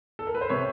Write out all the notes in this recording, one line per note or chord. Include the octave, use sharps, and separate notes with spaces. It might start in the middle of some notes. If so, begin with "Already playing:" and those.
A4
A#4
B4
C5
C3 C#5